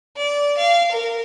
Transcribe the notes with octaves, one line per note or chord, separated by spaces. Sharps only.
D5
F5
A#4